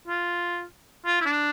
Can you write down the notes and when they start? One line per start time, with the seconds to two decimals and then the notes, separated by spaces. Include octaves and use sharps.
0.08 F4
1.06 F4
1.21 E4
1.25 D4